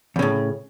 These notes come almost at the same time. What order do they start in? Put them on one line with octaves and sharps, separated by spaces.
E2 C#3 A2